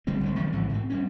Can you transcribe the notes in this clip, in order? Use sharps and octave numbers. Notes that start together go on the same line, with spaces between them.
D3 G3 G#3 C4
G#1 D2 A3
D#3 F3 G3 C4
A1 G#2 D3 E3
G#2 C4
G3 C4 C#4